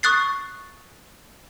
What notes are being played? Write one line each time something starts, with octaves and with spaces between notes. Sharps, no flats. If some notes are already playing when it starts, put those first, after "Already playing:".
C#6 D#6 F#6 A6 C7